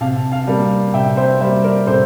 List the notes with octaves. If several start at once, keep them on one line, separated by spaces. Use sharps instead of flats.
C3 F5 A5
F5 A5
G3 A#3
C3 E5 G5
C5 E5
G3 A#3 C5 E5
A#4 D5
C3 A4 C5